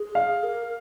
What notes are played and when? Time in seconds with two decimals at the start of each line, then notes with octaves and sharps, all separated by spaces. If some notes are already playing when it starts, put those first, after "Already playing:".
Already playing: G#4
0.15 F5
0.43 A#4